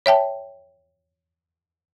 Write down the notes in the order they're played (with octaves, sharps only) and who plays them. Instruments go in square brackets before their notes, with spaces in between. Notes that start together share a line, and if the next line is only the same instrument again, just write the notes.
[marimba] C#5 E5 G5 A5